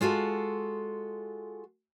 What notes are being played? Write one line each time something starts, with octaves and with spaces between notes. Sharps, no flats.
G#3 F4 F#4 A4